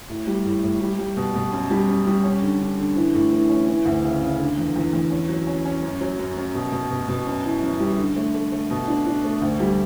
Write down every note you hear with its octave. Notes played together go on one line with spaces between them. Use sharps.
A2
G3
A2
A2
G3
G3
B2
B2
F#2
G3
F#2
G3
C#4
D3
D3
D3
E3
A2
E3
C#4
E3
D2
C#3
C#3
D3
E2
E2
E2
C#4
F#3
C#4
C#4
F#2
F#3
F#2
F#2
B2
B2
B2
B2
F#2
E3
F#2
G3
D3
A3
A3
A3
B2
D4
D4
A3
D2
G3